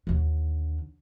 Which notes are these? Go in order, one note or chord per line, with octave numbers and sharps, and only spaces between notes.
D#2 D3